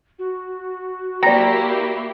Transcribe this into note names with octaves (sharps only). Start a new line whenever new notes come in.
F#4
A#3 E4 G4 D5 G5 A#5